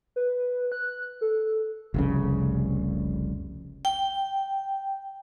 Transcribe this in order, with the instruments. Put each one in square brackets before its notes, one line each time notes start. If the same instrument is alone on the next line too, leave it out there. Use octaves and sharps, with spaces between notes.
[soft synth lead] B4
F#6
A4
[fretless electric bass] F1 C2 C#3
[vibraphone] G5